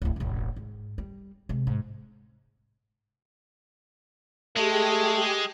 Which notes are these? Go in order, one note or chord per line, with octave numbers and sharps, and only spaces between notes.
D1 E4
E1 A1
G#2
G3
C3 G#3
G#2
G#3 A3 G4 G#4